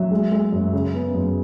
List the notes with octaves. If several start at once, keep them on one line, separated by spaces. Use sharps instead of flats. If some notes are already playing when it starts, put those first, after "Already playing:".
Already playing: F#3 E5
G#3
G#3
F#2
C#3
B3
F#2